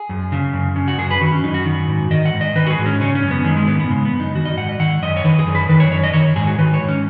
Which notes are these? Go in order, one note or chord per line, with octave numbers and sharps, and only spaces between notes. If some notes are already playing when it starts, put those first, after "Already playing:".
Already playing: G#4
F#2
C#3
F#2
C#3
F#4
F#2 G#4
B4
D#3 F#4
C#4
F#2 D#4
F#4
D#3
G#2
D#3 D#5
F#5
G#2
D#5
D#3 B4
F#4
G#4
G#2
C#4
C#3 C#4
C#4
F#2
B3
D#3 G#3
G#3
G#2 B3
B3
C#3 G#3
B3
F#2
D#4
D#3 F#4
D#5
G#2 F#5
D#5
D#3 F#5
F#2 D#5
C#5
D#3 B4
G#4
F#2
B4
D#3 B4
C#5
F#2 C#5
D#5
D#3 C#5
G#2 G#4
F#4
D#3 B4
C#5
G#2
C#4